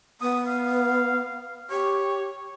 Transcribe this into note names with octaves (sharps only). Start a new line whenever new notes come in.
B3 D#6
F5
G4 C#5